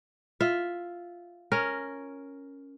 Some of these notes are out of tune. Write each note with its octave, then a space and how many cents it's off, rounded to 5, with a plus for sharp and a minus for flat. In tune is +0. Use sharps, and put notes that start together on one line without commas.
F4 +0 E5 +0
C#4 +0 A#4 +0